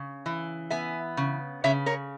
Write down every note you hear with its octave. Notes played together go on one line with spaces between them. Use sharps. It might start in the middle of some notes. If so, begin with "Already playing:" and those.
Already playing: C#3
E3
B3 E5 G#5
C#3
C#3 C#5 E5
A#4 C#5